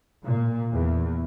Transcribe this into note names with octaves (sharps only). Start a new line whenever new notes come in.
A#2
E2